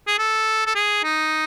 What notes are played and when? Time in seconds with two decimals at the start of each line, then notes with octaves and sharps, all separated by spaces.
0.07 G#4
0.19 A4
0.66 A4
0.75 G#4
1.04 D#4